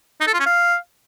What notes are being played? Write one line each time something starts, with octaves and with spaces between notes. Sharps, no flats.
D#4
A4
F4
C#4
F5